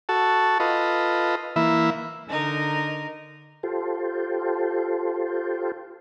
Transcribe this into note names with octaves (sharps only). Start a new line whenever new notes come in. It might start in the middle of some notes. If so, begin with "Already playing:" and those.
F#4 A4 A5
F4 A4 B4 D#5
E3 A#3 E4 E5
D3 D#4 A#4
F4 G4 A4 C5